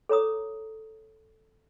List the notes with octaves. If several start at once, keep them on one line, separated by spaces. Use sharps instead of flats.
A4 C#5 A#5 D#6